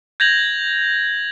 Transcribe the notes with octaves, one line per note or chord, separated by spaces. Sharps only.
G6 G#6 A#6 F7 F#7